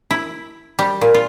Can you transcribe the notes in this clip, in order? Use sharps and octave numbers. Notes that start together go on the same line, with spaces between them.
E4
G3
A#2
F4